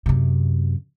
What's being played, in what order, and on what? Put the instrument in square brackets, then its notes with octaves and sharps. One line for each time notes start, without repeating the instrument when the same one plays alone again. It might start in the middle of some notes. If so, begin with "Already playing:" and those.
[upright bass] F#2 C3